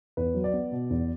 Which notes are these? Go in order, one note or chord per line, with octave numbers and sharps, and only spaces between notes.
E2 B4
F#3
D5
B3
B2
E2